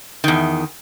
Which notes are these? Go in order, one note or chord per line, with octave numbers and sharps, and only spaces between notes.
E2 D#3